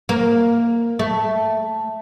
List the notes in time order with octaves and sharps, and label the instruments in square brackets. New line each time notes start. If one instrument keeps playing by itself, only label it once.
[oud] A#3
A3